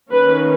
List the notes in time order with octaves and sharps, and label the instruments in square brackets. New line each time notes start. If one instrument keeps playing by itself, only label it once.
[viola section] D#3 A#3 C#4 B4